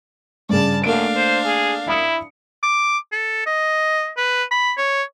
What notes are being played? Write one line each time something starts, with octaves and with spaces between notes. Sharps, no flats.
G2 C#3 D5 A5
F#2 A3 A#3 D4 F5 D7
C5
G#4
E4 B5 D#6 C#7
D6
A4
D#5
B4
B5
C#5